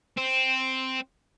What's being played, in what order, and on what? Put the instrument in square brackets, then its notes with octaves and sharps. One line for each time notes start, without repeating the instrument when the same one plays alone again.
[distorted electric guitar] C4